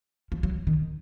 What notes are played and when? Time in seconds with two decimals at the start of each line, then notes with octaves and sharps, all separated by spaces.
0.32 F3
0.43 F#3
0.67 D#3